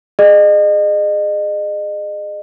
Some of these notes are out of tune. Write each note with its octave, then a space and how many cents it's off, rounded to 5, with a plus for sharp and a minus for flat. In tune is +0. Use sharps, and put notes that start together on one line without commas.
G#4 +0 D#5 -35